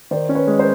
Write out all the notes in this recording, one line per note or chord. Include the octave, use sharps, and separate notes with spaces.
D#3 C5 D5
C#4
B4 C#5
G#3
A#4 C5